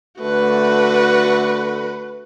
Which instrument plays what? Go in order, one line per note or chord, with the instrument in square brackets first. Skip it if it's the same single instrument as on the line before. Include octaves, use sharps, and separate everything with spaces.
[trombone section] D3 A3 [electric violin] F#4 B4